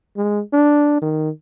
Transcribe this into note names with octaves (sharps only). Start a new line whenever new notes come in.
G#3
D4
D#3